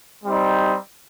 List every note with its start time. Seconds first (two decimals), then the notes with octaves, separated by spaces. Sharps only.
0.23 G3 C4 D#4